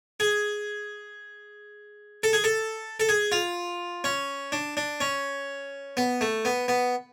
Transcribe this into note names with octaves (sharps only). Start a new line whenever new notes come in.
G#4
A4
G#4
A4
A4
G#4
F4
C#4
D4
D4
C#4
B3
A3
B3
B3